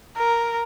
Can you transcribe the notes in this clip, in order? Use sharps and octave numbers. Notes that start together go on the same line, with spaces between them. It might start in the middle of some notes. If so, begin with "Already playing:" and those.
A#4